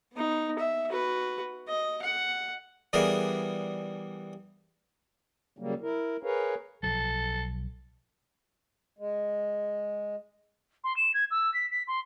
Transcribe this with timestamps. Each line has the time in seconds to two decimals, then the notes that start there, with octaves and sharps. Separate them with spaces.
0.13 B3 D#4
0.59 E5
0.88 F#4 B4
1.68 D#5
2.02 F#5
2.93 E3 G3 B3 D4 G#4 A#4
5.59 C#3 F#3 G3 A#3
5.82 E4 A#4
6.23 G#4 A#4 B4 C#5 F5
6.83 B1 F3 F#3 A4
8.99 G#3
10.84 C6
10.96 E7
11.14 G#6
11.31 E6
11.54 B6
11.70 B6
11.88 C6